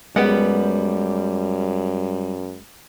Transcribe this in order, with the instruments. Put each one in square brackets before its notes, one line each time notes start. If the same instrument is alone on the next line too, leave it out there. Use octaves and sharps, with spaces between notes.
[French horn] F#2 [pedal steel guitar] G3 [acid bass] G#3 [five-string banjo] B3 G4 F#5